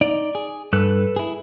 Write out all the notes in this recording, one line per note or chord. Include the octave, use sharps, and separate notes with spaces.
D#4 D5
G#4
G2 A4 B4 F#6
E4 G#4